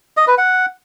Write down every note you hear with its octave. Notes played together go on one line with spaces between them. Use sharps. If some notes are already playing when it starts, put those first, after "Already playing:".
D#5
B4
F#5